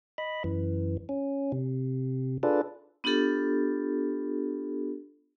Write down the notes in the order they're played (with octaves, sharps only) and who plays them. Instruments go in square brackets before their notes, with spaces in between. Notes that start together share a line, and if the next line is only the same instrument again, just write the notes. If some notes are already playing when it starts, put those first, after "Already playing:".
[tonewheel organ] D#5 B5
F#2 E3
C#4
C3
D4 F4 G#4 A4 B4 D5
[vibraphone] B3 D4 F4 G4 A4